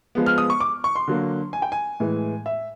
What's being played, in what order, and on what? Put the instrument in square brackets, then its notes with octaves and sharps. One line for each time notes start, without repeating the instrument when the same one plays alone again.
[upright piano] F3 G#3 B3
F6
D#6
C#6
D6
C#6
C6
D3 F#3 A#3
G#5
G5
G#5
A2 E3 G#3
E5